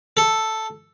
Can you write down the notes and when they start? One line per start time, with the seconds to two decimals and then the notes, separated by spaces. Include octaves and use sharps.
0.17 A4